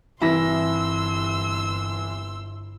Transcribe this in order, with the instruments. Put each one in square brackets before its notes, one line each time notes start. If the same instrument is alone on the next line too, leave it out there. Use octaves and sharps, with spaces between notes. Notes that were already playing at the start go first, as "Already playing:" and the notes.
[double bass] G1 [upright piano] C2 E3 A#6 [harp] E4 [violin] C6 E6